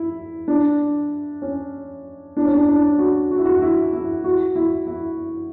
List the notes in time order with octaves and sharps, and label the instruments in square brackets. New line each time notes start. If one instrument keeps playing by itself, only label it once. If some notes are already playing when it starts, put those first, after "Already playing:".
Already playing: [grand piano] E4
D4
C#4
D4
C#4
D4
D4
F#4
F#4
E4
F#4
E4
E4
F#4
E4
E4